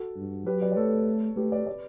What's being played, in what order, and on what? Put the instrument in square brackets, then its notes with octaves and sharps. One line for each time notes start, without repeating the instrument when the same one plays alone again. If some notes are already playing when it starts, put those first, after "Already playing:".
Already playing: [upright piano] F#4 A4
[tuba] G2
[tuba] F#3 [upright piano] G4 B4
[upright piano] B4 D5
D5
[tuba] A3 [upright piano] A4 C#5
[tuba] A3 [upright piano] G4 B4
[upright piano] B4 D5
B4 D5